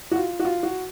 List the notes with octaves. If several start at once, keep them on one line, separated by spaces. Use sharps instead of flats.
F#4
F4
F#4
F4
F#4